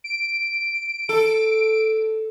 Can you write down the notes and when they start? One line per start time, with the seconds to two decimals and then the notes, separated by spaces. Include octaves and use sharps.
0.04 D7
1.09 A4